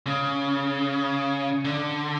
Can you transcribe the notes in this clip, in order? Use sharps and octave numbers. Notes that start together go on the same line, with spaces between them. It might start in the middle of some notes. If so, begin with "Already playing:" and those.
C#3
D3